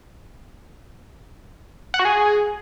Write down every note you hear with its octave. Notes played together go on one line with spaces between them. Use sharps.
F#5
F#4
G#4